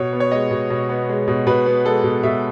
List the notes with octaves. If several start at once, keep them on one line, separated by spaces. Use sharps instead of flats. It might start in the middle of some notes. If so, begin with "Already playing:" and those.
Already playing: B2 C#5
B3
C#5
G#3 D#5
B2
B2
B3
G#3
B2
B2 B4
B3
G#3 A4
B2
B2 E5